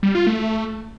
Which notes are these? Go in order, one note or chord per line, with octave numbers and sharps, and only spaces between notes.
G3
F4
A3